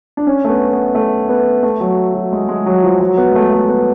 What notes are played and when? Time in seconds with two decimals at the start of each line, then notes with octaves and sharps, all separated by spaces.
0.17 D4
0.27 C#4
0.44 A3
0.49 B3
0.72 B3
0.95 A3
1.29 B3
1.63 A3
1.80 F#3
2.14 F#3
2.33 G#3
2.49 G#3
2.66 F#3
2.84 F3
3.00 F#3
3.17 B3
3.30 G#3
3.35 A3
3.52 A3
3.68 B3